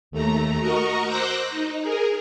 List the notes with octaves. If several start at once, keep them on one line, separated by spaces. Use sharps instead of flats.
D#2 A3 A#5
F#4 A#4 D#5 A#5 C#6
C5 D6 E6 F#6 G6 A#6
D#4
G#4 A#4